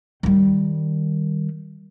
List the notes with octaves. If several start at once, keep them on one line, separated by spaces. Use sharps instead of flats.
D#3 G3